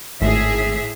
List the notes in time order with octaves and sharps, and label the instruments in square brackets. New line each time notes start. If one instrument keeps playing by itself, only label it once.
[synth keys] G#1 [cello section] A2 G#4 E5